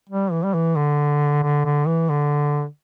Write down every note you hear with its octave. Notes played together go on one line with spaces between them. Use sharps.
G3
E3
G3
E3
D3
D3
D3
E3
D3